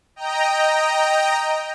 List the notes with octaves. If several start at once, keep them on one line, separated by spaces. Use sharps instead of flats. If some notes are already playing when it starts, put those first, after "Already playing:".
D#5 G5 A#5